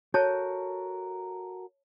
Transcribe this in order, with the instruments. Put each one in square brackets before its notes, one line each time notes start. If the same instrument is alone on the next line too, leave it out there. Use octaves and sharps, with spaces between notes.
[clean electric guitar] F#4 A4 A#4 [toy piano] C#5 A5